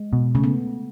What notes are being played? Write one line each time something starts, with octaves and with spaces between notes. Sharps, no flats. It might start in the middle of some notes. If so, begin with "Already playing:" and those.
Already playing: G#3
B2
C#3 A3
B3